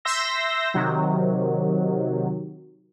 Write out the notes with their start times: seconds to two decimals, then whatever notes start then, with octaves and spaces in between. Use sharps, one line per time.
0.05 E5 C6 E6 G6 A#6
0.74 C3 D#3 F#3